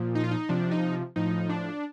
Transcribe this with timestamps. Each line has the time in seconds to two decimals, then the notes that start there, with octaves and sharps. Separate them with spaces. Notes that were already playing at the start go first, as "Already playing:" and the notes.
Already playing: A#2 F3
0.15 D#4
0.24 F4
0.31 D#4
0.49 C3 F3 D4
0.71 D#4
1.16 A2 F3 D#4
1.49 D4